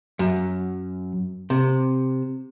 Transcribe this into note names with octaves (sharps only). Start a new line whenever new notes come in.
F#2
C3